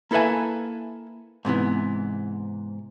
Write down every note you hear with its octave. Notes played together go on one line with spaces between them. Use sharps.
A#3 E4 A4 B4 E5 G#5
G#2 C3 E3 B3